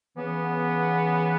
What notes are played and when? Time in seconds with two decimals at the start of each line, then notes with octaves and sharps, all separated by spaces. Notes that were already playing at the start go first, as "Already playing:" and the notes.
0.16 C#3 E3 B3